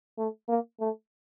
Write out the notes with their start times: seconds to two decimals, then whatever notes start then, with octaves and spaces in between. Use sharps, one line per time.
0.18 A3
0.49 A#3
0.80 A3